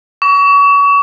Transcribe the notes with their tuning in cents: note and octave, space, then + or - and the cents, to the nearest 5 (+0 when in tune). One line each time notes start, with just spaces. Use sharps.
C#6 +35